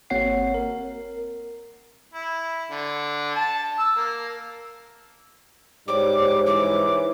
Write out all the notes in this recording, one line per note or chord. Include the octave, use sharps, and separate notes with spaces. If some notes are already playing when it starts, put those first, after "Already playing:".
G#1 A#3 C4 C#5 F#5 C7
A#4
E4
D3
A5
E6
A#3
G#2 G3 C5 C#5 D6
E3 D6